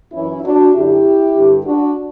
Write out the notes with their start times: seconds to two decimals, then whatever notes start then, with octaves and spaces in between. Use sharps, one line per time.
0.13 F#2 E3 C#4 E4
0.43 D4 F#4
0.74 F#2 D3 E4 G4
1.35 G2 D3
1.65 D4 F#4